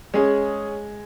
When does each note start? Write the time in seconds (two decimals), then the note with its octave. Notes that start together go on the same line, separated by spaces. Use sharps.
0.14 G#3 C#4 G#4